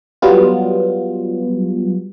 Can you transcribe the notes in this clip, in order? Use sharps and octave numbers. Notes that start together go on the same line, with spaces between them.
F#3 G3 B3 F4